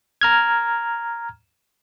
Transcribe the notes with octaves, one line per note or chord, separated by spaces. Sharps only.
A#5 F6 G#6